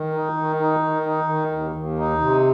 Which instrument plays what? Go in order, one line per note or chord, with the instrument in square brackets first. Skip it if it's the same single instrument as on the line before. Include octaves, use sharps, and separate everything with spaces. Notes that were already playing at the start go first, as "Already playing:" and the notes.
Already playing: [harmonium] D#3
D#4
D#3
D#4
D#3
D#4
D#3
D#2
D#2
D#4
C3